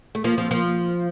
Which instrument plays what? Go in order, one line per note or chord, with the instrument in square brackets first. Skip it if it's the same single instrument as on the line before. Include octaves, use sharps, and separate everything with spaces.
[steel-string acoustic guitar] A3
[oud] F3 [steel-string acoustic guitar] A#3
[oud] F3 [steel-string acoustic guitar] C4
[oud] F3 [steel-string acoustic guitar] A#3